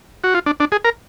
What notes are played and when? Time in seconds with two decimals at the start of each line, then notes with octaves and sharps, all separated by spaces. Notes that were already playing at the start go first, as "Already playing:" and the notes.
0.24 F#4
0.34 F4
0.46 D4
0.60 D4
0.72 G#4
0.85 A#4